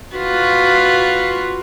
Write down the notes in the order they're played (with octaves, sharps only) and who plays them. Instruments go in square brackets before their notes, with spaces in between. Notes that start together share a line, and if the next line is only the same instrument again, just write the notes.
[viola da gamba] F4 F#4 B4